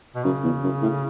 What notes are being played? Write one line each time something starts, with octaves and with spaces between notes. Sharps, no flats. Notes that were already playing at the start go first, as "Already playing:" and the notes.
B2
F#2 C#3
E2
F#2
A2